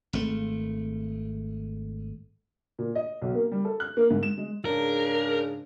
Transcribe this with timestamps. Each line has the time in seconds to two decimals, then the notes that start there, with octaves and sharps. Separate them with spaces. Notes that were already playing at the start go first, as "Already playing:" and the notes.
0.13 G#1 A3
2.79 A#2
2.95 D#5
3.22 B1
3.35 A#3
3.52 G3
3.65 A4
3.80 F#6
3.97 A#3
4.11 G#2
4.23 E7
4.38 G#3
4.65 G#2 C#3 D4 A#4